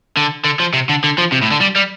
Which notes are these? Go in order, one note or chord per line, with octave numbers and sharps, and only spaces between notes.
D3
D3
F3
C3
D3
D3
F3
C3
A2
D3
G3
G3